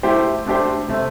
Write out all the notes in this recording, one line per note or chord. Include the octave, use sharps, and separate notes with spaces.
A3 E4 G4 C5
A3 D4 G4 C5
C3 A3 C4